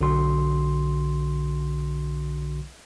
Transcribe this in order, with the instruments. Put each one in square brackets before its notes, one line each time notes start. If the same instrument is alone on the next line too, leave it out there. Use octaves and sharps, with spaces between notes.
[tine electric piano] B1 D3 F#4 C6